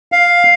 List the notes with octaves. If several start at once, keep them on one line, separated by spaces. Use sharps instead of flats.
F5